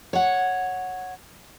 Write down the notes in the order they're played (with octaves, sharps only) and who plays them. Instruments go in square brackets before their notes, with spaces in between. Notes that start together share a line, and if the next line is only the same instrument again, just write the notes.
[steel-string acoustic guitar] C#5 F#5